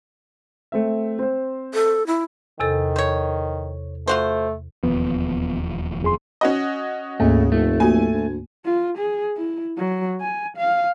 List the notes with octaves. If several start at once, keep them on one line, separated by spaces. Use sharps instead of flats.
A3 C4 E5
C4 C5
A4
E4
E2 C3 D#3 A4
C5 C#5
A3 F4 F#4 C5
E1 D#2 F3 B3
F2 G#4 C6
C#4 F#4 D#5
D2 G#2 C#3 A3 A#3
F1 A3
A#3 F#4 G#5
D2
F4
G#4
E4
F#3
G#5
F5